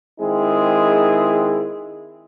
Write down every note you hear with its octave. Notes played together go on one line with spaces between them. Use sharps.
D#3 G#3 C4 E4 G#4